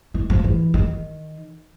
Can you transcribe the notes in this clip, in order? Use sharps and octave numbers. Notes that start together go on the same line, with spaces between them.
E3
F3
E3
D#3